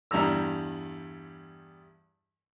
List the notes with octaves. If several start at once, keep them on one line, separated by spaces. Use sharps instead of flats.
E2 G2 G3 A#5 E6